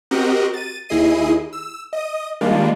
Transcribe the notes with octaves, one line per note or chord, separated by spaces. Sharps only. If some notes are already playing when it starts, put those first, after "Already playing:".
C4 F#4 G4 A#4 D#5 F#5
A6 D#7
D#2 E4 G#4 D#5 C7 D#7
E6
D#5 D#6
D#3 G3 G#3 A#3 D4 F4